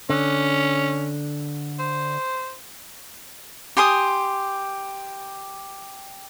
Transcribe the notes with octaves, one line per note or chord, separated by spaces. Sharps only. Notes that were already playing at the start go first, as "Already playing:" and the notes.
D3 C#4
C5
G4 G#5 C6 D#6